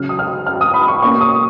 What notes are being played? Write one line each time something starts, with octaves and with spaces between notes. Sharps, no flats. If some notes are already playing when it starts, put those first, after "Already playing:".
Already playing: C#3 F#3 C#4 F6
D#6
F6
F6
D#6
B5
C#6
B2 A#3 C#4 C#6
D#6